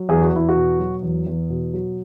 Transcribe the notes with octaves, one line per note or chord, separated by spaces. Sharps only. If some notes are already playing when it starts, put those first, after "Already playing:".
Already playing: F#3
E2 G#4
F#4
E2 E4
F#4
B2
F#3
E2
E2
B2
F#3